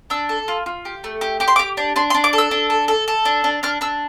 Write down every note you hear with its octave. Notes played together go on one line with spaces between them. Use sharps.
D4 E6
A4
F4
F4
G4
A3
G4
G4 D6
C6
G4 D6
D4
D4 C6
C6
D4
D6
A4
E6
D4
A4
A4
A4
D4
D4
D4 F6
D4 E6